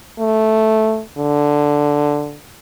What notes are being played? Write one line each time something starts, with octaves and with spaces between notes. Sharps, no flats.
A3
D3